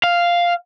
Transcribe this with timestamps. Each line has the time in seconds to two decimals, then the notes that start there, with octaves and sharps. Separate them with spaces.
0.04 F5